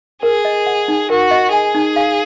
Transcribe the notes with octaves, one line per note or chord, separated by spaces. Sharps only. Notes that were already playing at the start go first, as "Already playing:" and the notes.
G#4 A#4
D#5
F#5
D#4
F#4 A#4
D#5
G#4 G#5
D#4
F5